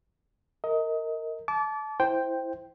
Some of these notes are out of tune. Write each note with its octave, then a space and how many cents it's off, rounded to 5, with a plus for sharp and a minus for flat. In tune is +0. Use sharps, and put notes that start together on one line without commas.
A#4 -20 D#5 +25
A5 -30 D6 -25
E4 +0 C5 +0 G5 +0